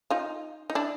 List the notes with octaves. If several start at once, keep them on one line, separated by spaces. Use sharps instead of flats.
D#4 F4
D#4
D4 E4